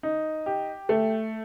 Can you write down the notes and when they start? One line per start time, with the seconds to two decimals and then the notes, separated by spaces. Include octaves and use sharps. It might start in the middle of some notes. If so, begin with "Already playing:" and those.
0.03 D#4
0.46 G4
0.89 A3